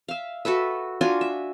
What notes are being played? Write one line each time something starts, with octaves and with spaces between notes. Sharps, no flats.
E5 F5
F#4 A4 B4 E5
D4 F4 F#4 G#5
E5